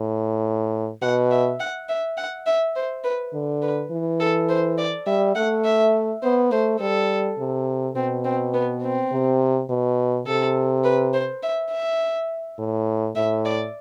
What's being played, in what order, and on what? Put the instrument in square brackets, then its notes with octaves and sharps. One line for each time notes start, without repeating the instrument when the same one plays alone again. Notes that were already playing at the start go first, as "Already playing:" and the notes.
Already playing: [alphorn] A2
[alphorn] B2 [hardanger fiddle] F#5
[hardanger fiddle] E5
F#5
E5
F#5
E5
C5
B4
[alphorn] D3
[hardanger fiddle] B4
[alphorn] E3
[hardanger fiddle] A4
C5
D5
[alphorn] G3 [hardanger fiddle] E5
[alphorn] A3 [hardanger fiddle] F#5
[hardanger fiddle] E5
[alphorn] B3 [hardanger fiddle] C5
[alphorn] A3 [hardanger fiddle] C5
[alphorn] G3 [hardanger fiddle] A4
[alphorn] C3
[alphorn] B2 [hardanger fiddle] C4
[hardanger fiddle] C4
B3
C4
[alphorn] C3
B2
[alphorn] C3 [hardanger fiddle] A4
[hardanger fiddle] B4
C5
E5
E5
[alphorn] A2
[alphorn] A2 [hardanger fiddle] E5
[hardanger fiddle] D5